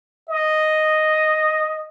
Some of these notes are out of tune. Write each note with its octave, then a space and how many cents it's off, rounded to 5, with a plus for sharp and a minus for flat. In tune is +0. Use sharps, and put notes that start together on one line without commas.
D#5 +0